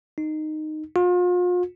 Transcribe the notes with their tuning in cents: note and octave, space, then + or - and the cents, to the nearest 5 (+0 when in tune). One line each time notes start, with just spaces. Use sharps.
D#4 -10
F4 +40